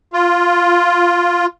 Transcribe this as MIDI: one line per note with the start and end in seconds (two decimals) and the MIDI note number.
0.13 1.46 65